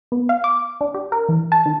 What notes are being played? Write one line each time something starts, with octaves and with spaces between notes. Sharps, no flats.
B3
F5
D6
D4
G4
A#4
E3
A5
D#3